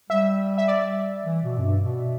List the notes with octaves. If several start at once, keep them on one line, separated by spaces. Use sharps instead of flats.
G3 E5
E5
D5
E3
B2
F#2
G2
B2